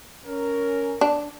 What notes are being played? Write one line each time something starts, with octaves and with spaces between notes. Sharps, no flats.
C#4 A#4
D4